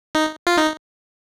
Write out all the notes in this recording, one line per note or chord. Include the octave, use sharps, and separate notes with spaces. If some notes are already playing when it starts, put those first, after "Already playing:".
D#4
F4
D#4